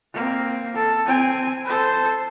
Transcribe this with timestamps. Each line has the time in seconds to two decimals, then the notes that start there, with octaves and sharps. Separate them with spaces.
0.14 A#3 C4
0.75 A4
1.06 C4 G#5
1.65 A4 C5